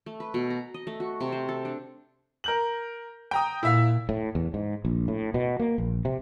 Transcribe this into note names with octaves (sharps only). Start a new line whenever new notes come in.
A3
B4
B2
A#5
D#5
A3
F#4
C3
C5
A4
D4
A#4 G6 F#7
G5 A#5 D#6
A#2 E4 E5 F5
A2
E2
G#2
A#1
A2
B2
A#3
A#1
C3